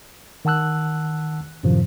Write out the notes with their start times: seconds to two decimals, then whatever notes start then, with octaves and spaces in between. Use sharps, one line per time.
0.45 D#3 F#5 A5 E6 F#6
1.63 F#2 A2 C3 D#3 F3